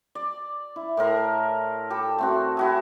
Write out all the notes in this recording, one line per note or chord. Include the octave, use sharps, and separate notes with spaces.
D5
E4
A2 A4 A#4 C6
G4 A4 B5
A3 C4 F#4
E4 F#4 G#4